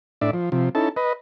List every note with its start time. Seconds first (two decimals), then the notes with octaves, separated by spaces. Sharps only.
0.21 A2 D4 D5 E5
0.33 F3
0.52 C3 F3
0.75 C#4 D#4 E4 A4 A5
0.96 B4 D#5